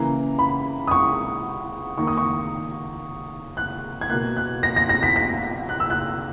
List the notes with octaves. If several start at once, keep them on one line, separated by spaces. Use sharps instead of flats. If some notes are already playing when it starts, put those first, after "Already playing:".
Already playing: C#3 E3 A#3 A#5
B5
D#6
C#6
D#3 A#3 C#6
D#6
C#6
F#6
G#6
B2 A#3 F#6
F#6
A#6
A#6
A#6
B6
B6
F#6
E6
F#6